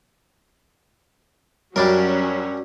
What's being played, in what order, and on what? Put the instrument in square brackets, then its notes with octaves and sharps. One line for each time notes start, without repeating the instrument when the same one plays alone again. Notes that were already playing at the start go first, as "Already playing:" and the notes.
[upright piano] F#2 [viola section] F#3 C#4 [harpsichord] G3 D4 A#4